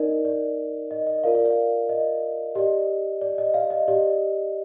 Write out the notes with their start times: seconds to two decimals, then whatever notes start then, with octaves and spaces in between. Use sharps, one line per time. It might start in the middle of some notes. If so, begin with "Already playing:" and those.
Already playing: D#4 A#4 D5 D#5
0.25 D5
0.91 D#5
1.07 D#5
1.24 F4 A#4 D5 F5
1.34 D5 F5
1.45 D5 F5
1.89 D#5
2.55 G4 D5 D#5
3.21 D5
3.38 D#5
3.54 D5 F5
3.70 D#5
3.88 G4 D5 D#5